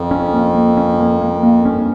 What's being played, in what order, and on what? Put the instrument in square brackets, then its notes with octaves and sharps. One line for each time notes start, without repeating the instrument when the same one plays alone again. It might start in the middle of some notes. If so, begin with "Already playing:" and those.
Already playing: [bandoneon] F2
[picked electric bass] C#4
A#3
A#3
C#4
A#3
A#3
A#3
[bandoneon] G2 [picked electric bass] C#4